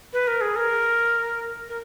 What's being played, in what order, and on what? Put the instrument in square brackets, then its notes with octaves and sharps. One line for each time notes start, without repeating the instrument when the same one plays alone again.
[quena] B4
A#4
G#4
A#4
A#4